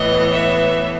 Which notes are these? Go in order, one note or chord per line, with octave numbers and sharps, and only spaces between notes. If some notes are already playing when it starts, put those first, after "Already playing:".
Already playing: A2 E3 B3 D#5
E5